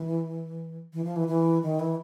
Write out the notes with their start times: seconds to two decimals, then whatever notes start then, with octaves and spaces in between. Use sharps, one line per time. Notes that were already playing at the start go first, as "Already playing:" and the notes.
Already playing: E3
0.93 E3
1.04 F3
1.16 E3
1.28 E3
1.62 D#3
1.79 E3